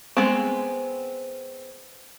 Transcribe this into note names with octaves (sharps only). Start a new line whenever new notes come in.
G#3 B3 C4